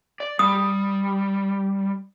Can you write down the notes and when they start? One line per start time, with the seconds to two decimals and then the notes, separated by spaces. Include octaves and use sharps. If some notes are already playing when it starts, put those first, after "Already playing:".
0.20 D5
0.39 G3 D#6